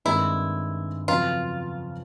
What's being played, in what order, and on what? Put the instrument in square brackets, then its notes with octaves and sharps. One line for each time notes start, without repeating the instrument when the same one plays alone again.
[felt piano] G2 D#3 G#3 C4 [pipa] E4
[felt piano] F2 C#3 F#3 B3 [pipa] F4